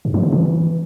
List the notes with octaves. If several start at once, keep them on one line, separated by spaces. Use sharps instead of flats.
G2
F3
C#3
E3